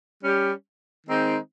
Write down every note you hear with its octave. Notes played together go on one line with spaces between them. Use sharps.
G3 C#4 G4
D#3 G#3 C4 D#4